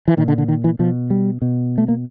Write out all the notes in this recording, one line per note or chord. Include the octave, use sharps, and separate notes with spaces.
E3
A#2 D#3
D3
D3
D#3
E3
B2 F3
G3
B2
A3
A#3